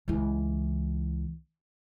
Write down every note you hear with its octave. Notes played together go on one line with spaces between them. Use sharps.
C#2 E3